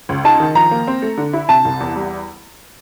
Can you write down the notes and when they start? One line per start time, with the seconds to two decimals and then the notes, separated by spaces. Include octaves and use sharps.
0.09 C#2
0.25 D#4 A5
0.40 D#3
0.55 F3 A#5
0.71 A#3
0.87 C4
1.02 A3
1.18 D3
1.33 E4
1.49 C3 A5
1.65 C2
1.80 E2
1.95 G3